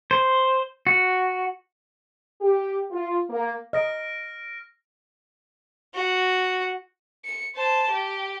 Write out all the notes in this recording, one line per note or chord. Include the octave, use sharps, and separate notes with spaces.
C5
F#4
G4
F4
A#3
D#5 F6 A#6 D7
F#4
C#7
C5 A5
G4